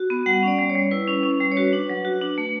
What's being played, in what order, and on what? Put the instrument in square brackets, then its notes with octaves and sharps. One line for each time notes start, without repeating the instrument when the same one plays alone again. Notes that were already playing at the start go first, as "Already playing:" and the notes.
Already playing: [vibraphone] F#4
B3
G3 F#5
C#4 D5
G3
C#5
G3
E4 B4
C#4
C#4
G3
C#5
F#4 B4
D4
F#3
F#4
D4
A3